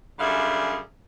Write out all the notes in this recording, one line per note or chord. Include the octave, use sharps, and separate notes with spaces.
F#2 D3 G3 G#4 E5 F5